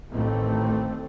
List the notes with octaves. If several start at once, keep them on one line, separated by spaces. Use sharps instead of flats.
A1 D#2 A3 C4